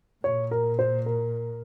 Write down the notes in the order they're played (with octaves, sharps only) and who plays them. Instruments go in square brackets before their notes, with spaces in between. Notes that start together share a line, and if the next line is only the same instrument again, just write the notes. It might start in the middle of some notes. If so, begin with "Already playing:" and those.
[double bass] A#2 [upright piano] C#5
[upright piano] A#4
C5
A#4